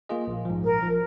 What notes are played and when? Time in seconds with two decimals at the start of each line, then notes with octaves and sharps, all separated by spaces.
0.09 A#3 F4 G#4 D#5
0.27 A#1
0.45 G#2 F3
0.64 A#1 A#4
0.83 F3